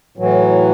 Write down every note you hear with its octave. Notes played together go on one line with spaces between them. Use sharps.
A2 E3 F#3